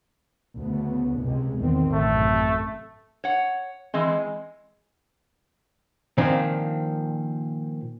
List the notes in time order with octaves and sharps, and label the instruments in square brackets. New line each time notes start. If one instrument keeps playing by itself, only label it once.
[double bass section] D2 C#3 B3
C#2 C3 G#3
E2 D#3 C4
[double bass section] A1 F#2 C3 [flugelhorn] A3
[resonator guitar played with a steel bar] C#5 F#5
[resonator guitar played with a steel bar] E3 C4 [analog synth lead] G#3
[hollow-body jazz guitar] A#2 D#3 F3 C4 D4